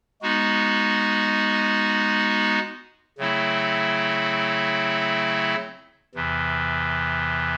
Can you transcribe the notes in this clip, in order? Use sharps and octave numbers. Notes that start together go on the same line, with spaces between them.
G#3 B3 D#4 F#4
C#3 F#3 A3 C4 E4
E2 C3 E3